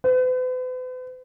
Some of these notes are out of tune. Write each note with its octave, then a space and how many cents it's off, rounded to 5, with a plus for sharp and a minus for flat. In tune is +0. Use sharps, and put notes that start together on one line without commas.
B4 +45